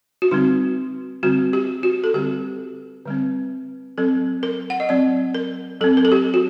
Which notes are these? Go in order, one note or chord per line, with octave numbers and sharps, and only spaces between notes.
F#4
D3 G3 C4 D#4
D3 G3 C4 F#4
G4
F#4
A4
D3 G3 C4 G4
D3 G3 C4
F#3 C4 A4
A#4
F#5
D#5
F#3 C4 D5
A#4
F#3 C4 A4
A#4
A4
G4
F#4